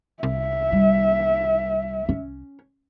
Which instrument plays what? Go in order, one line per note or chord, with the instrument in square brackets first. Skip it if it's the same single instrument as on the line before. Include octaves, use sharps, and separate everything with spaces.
[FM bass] C2 [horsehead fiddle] E5
[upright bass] G3
C#4